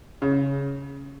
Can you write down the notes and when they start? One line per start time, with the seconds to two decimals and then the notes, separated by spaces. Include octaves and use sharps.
0.22 C#3